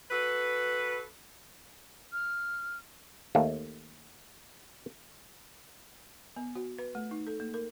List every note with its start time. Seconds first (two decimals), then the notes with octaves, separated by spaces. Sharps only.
0.11 F#4 A4 B4
2.13 F6
3.35 D#2 A3 A#3
6.36 B3
6.55 F#4
6.78 B4
6.95 A3
7.11 D#4
7.27 A4
7.40 A#3
7.54 A#4